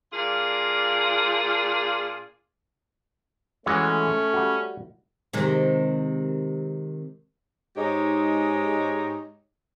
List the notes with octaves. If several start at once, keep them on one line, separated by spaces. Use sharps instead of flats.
A#2 D4 F4 G#4 D5 F5
E3 G#3 A3 C#4 F#4
G3 F#4
C3 D#3 G#3
G#2 G#3 D#4 G4 C#5 D#5